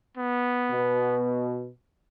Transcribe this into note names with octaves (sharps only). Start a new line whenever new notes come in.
B3
B2